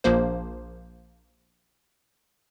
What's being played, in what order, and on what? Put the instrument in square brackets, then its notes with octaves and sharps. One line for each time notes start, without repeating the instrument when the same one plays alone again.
[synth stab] A#1 F3 A#3 C5